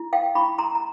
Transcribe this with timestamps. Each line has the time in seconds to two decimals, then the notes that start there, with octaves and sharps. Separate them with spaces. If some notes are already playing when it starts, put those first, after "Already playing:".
Already playing: E4
0.13 F5 G5
0.35 E4 B5 C#6
0.58 A#5 C6
0.75 A#5